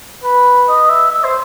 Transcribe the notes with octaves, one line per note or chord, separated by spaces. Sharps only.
B4
D#5
E5
E5
C5